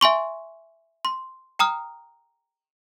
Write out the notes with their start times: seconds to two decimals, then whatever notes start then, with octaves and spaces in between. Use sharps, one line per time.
0.01 E5 G#5 C6 C#6
1.05 C6
1.59 G5 A#5 D#6 F6